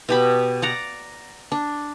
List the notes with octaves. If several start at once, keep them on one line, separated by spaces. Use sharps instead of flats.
B2 G4 B5
D5 F#5 A#5
D4